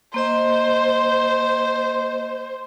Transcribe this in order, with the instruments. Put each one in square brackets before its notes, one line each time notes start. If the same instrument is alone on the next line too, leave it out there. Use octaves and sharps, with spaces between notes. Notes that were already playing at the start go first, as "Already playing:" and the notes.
[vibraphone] A#3 D#5 [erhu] C5